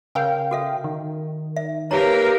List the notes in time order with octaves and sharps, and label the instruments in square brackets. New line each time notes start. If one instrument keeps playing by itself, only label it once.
[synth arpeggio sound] C#3 F5 G5 [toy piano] A#4 G#5
[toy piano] F#4 A4 E5
[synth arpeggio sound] D#3
[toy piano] E5
[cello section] A#3 A#4 [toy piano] D#4 C#5 A#5 [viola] G4 B4